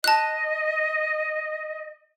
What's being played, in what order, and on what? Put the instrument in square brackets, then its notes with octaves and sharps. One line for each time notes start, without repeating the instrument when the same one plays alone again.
[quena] D#5 [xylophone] A5 F#6